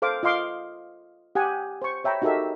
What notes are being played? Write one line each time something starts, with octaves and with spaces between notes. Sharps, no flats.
A4 C5 F5 D6
F4 D#5 F5 C6 D6
G4 F#5 G#5 D#6
C5 C#6
C#5 E5 G5 A#5 B5
D#4 F#4 G4 A4 A#4 E5